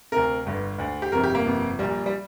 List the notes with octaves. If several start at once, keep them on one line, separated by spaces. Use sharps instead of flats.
D2 C3 A#4
G1 G2 D3
D2 D3
G4
G1 F2 C3 A#4
G4
A#3
G1 F2 C3
A#1 A#2 G3
G3